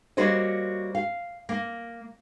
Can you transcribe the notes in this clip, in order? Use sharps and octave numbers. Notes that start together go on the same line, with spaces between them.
G3 A#3 F#4 C5 C#5 D#5
F5
A#3